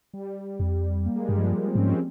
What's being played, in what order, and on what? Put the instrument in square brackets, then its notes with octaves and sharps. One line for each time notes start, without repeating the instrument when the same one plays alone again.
[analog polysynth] G3
[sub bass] F2
[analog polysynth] A#3
G#3
[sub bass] G2 [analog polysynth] G3 A#3
[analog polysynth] F3 G#3
C4
[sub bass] G#2 [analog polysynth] C#4
[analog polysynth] G#3 C4